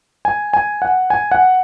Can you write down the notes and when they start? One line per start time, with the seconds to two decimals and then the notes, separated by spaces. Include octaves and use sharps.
0.25 G#5
0.54 G#5
0.82 F#5
1.10 G#5
1.32 F#5